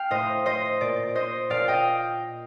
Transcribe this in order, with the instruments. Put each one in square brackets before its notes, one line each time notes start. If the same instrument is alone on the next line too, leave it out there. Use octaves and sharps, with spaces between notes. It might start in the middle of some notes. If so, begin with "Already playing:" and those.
Already playing: [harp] F5 G5
A2 C5 D#5
C5 D#5
A#2 D5
C5 D#5
A#2 D5 F5
D#5 G5